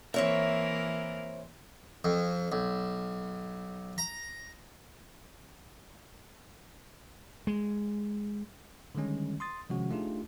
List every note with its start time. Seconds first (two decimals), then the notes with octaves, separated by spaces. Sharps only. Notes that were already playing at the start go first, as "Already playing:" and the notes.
0.14 E3 A#3 C4 A#4 C#5 E5
2.05 F2
2.52 B1
3.98 A#5
7.47 G#3
8.95 D3 D#3 G3 G#3 C#4
9.40 C6 D#6 A6
9.70 C3 D#3 F3 G#3 C#4 F#4
9.91 A3 D4 D#4 F4 G4 G#4